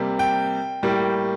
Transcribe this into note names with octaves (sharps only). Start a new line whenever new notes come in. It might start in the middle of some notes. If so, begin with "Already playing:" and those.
Already playing: C3 G3 A#3
G5
A2 G3 A#3